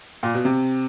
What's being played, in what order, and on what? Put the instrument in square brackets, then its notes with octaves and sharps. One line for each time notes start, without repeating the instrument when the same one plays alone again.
[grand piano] A#2
B2
C3